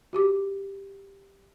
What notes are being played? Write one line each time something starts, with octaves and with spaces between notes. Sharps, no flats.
F#4 G4 D6